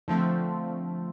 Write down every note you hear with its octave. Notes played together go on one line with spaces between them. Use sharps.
D3 F3 A3 C4